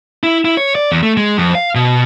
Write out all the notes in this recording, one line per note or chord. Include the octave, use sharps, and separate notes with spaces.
E4
E4
C#5
D5
E2
A3
G#3
F2
F5
B2